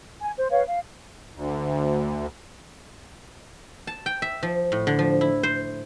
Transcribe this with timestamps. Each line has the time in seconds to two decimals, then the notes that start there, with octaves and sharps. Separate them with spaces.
0.21 G#5
0.37 C5
0.51 B4 C#5 F5
0.67 F5
1.35 D2
3.87 A5
4.06 G5
4.22 E5
4.43 F3
4.72 A2
4.87 D3
4.99 F3
5.21 E4
5.43 C5